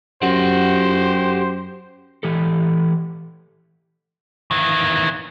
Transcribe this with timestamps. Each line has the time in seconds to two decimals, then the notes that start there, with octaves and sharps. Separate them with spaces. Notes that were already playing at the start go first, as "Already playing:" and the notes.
0.22 F#2 G4 C5 F#5
2.23 E3 G4 A4
4.51 D#3 E3